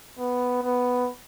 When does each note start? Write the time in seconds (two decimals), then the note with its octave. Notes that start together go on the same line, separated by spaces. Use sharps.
0.19 B3
0.63 B3